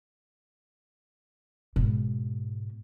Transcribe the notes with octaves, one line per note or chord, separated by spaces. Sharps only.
G#2 B2